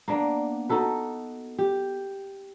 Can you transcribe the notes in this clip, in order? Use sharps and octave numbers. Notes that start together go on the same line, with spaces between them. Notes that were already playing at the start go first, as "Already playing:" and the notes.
A#3 B3 D4
D#4 F#4 A4 B4
G4